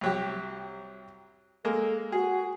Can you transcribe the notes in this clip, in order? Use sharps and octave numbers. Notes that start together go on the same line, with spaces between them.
C2 F#3 G4
G#3 A#3 A4
F#4 G#4